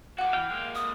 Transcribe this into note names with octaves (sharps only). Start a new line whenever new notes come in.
D#3 F#4 F#5 D6
E3 F5 G5
G#3 A#3
D#6